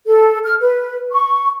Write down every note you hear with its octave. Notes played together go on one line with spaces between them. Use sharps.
A4
F6
B4
C#6